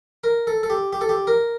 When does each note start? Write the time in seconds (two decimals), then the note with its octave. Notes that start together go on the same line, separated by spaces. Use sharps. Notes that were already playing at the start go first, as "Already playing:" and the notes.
0.24 A#4
0.47 A4
0.63 A4
0.70 G4
0.93 G4
1.01 A4
1.09 G4
1.27 A#4